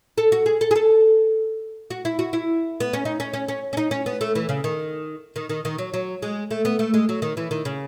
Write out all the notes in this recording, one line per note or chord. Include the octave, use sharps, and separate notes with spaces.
A4
F#4
G#4
A4
G#4
A4
F#4
E4
F#4
E4
B3
C#4
D#4
C#4
C#4
C#4
C#4
D#4
C#4
B3
A3
E3
C#3
D#3
D#3
D#3
D#3
F#3
F#3
G#3
A3
B3
A3
G#3
F#3
D#3
E3
D#3
C#3